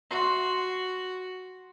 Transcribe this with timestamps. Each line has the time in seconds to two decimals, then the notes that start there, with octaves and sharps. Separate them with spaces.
0.11 F#4 C6